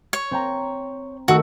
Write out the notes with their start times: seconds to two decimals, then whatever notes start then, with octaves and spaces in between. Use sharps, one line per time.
0.13 C#5
0.31 C4 G5 A#5
1.28 D#3 A3 F#4 E6